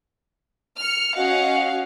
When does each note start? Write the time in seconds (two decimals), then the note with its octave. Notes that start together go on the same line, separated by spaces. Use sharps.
0.79 F6 C#7
1.16 C#4 F#4 D#5 F5 F#5